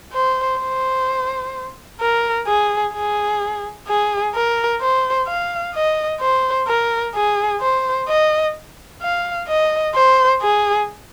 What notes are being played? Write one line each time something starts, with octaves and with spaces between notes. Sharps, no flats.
C5
C5
A#4
G#4
G#4
G#4
A#4
C5
F5
D#5
C5
A#4
G#4
C5
D#5
F5
D#5
C5
G#4